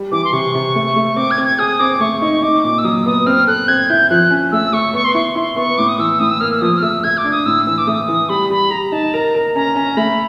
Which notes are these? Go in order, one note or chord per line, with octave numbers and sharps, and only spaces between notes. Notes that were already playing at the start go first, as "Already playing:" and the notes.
Already playing: G3
E3 D6
C6
C3 C#6
C3
A3
A3
C4 D6
G#6
C4
G#6
G#4 D#6
C4 D6
A3 C#6
D#4 C#6
D#4 D6
A#2 D6
E6
F#3 D#6
B3 D#6
C4 F6
A4 F#6
C4 G#6
E4 G6
F3 F#6
C#4
A3 E6
A3 C#6
B3 C#6
C6
E4 C#6
E4 C6
B3 C#6
A2 D6
D#6
E3 E6
A2 D#6
E6
A#3 F6
E6
F3 D#6
F6
A3 E6
A3 G#6
D6
D4
D#6
A2 E6
E3 E6
D6
A3 D#6
E3
G3 B5
G3 B5
G3 A#5
D#4 A5
A#4 A#5
A#4
C#4 A#5
C#4
A3 B5